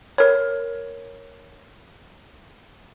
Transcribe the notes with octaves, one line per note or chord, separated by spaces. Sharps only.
A#4 C#5